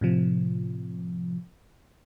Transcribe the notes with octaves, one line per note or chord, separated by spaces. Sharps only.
A2 C3 F3